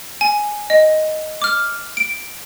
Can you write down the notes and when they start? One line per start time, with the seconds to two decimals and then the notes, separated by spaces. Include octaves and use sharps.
0.21 G#5
0.70 D#5
1.42 D6 F6
1.97 D7